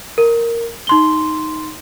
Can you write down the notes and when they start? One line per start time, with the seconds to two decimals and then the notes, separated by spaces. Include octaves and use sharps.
0.18 A#4
0.87 D#4 C6 G7